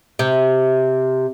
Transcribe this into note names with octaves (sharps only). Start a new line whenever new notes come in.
C3